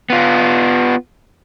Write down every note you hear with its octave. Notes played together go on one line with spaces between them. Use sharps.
B3 F4